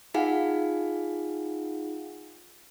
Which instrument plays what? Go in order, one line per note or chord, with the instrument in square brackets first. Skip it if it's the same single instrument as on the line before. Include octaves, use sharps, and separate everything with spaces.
[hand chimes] D#4 F4 G#4 F5 F#5 G#5